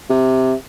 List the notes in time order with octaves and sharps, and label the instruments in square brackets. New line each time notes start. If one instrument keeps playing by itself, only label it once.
[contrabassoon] C3